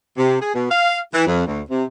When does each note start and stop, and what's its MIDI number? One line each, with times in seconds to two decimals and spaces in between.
0.17 0.39 48
0.40 0.52 68
0.54 0.68 47
0.70 0.99 77
1.13 1.24 52
1.26 1.46 41
1.47 1.61 38
1.69 1.84 48